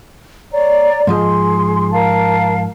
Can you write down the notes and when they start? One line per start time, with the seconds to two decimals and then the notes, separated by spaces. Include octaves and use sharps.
0.52 C#5 D5 A#5
1.07 G#2 F3 G#4 D#5 C6
1.92 A#4 F5 A5